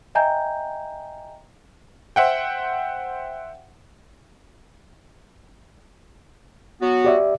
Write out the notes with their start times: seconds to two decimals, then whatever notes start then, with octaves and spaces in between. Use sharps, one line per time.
0.15 D#5 E5 G5 G#5 A#5 G6
2.16 C5 E5 F#5 G5
6.82 F#3 B3 F#4
7.04 G4 D5 E5